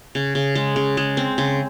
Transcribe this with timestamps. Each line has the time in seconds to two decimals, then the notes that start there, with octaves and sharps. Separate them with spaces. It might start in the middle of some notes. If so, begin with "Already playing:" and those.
0.15 C#3
0.35 C#3
0.55 G#3
0.76 C#3
0.97 G#3
1.17 C4
1.38 C#3